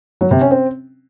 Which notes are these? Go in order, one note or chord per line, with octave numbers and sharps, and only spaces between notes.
F#3
C3
C#4
C4